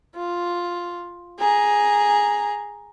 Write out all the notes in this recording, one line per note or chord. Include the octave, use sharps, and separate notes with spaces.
F4
G#4 A#5